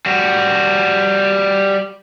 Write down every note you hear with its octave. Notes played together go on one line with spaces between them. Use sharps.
G3 F#4